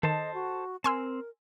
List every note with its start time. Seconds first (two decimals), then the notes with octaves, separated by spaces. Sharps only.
0.03 D#3 A4 C5 D#5 A5
0.34 F#4
0.84 C4 A#4 G#5 C6 E6